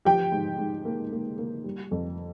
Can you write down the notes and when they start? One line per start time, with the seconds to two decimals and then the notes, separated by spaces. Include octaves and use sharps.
0.05 F3 G4 G5
0.32 G#2
0.58 G#2
0.85 A#3
1.12 A#3
1.39 A#3
1.64 G3
1.91 F2